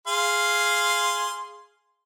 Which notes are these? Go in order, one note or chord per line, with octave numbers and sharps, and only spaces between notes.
G#4 F5 C6